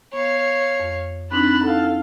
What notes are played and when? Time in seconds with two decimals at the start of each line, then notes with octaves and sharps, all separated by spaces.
0.13 B3 C#5 F5
0.80 F2
1.32 C4 D4 D#4 A5 B5 F#6
1.64 D#4 E4 A4 F5 F#5